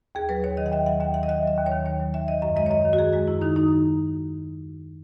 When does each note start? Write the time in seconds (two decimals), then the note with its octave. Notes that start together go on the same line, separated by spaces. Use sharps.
0.15 D#2 G#4
0.29 F#3 B4
0.43 D#2 C#5
0.57 D#3 D#5
0.66 F#5
0.71 D#2 E5
0.86 F#3 F#5
1.00 D#2 E5
1.14 D#3 F#5
1.23 D#5
1.29 D#2 E5
1.43 F#3 E5
1.57 D#2
1.66 C#5
1.72 D#3
1.85 D#2 C#5
2.00 F#3
2.14 D#2 E5
2.28 D#3 D#5
2.42 F#2 E5
2.56 G#3 D#5
2.66 C#5
2.71 F#2 D#5
2.85 D#3
2.93 F#4
2.99 F#2 G#4
3.13 G#3 F#4
3.28 F#2 E4
3.41 D#3 D#4
3.56 F#2 D#4